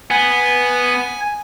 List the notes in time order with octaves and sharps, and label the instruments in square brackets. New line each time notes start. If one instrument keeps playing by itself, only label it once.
[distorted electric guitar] B3 [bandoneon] G#5